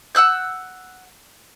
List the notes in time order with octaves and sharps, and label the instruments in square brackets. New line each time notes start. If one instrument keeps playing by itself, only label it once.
[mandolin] F#5 E6 F#6 G6